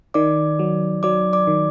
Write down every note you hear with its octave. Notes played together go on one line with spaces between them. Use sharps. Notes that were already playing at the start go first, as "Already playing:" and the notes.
D#3 D5 D6
F#3
F#3 D5 D6
D5 D6
D#3